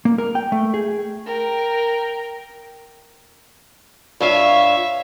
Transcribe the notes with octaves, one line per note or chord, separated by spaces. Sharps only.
A#3
A#4
G5
A3
G#4
A#4 G5
G2 F4 C#5 E5 F5